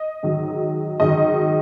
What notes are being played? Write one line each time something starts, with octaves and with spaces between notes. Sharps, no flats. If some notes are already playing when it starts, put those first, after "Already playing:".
Already playing: D#5
G#2 D#3 F#3
G#2 D#3 F#3 D#5